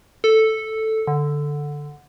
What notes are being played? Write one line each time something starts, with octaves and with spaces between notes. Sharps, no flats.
A4
D3